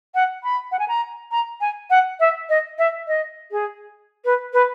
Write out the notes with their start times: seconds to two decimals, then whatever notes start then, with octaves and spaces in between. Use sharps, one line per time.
0.15 F#5
0.43 B5
0.72 F#5
0.79 G#5
0.88 A#5
1.31 A#5
1.61 G#5
1.90 F#5
2.20 E5
2.49 D#5
2.78 E5
3.08 D#5
3.51 G#4
4.25 B4
4.53 B4